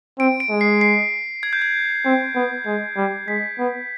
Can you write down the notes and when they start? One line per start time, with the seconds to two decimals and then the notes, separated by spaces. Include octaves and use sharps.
0.19 C4 D7
0.40 D7
0.50 G#3
0.61 C7
0.81 C7
1.43 G#6
1.53 G6
1.62 G#6
2.05 C4
2.35 B3
2.67 G#3
2.97 G3
3.28 G#3 B6
3.59 B3